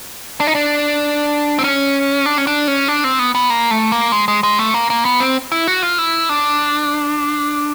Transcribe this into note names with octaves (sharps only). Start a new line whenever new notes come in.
D4
D#4
D4
C4
C#4
D4
C#4
D4
C#4
D4
C4
B3
B3
A#3
A3
A#3
G#3
G#3
G#3
A3
A#3
A#3
B3
C4
E4
F#4
F4
E4
D4